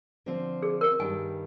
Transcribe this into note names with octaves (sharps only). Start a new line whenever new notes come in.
D3 F3 C4 F4
G#4
A#4
G2 D#3 G3 G#5